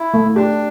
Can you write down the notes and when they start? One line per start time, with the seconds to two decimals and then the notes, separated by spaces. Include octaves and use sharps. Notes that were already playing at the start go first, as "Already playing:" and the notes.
Already playing: E4
0.14 A3
0.36 D4 G4